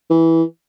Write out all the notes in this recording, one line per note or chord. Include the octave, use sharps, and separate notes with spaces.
E3